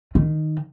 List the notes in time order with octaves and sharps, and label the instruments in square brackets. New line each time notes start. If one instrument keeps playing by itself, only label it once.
[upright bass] D#3